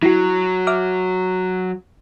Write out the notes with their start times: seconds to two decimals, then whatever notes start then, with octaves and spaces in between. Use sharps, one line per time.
0.03 F#3 E4 F#4
0.67 E5 D6 F6